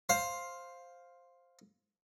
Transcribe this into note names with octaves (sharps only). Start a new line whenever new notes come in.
C5 F5 C6